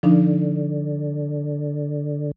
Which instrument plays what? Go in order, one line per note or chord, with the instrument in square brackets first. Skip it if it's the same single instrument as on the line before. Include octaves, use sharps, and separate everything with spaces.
[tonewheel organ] D3 [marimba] F3 D4 D#4